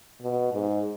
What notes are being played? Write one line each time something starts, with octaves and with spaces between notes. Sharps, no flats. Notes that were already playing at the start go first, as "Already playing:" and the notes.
B2
G#2